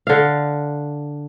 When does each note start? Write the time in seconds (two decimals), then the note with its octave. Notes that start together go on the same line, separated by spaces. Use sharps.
0.07 D3 F5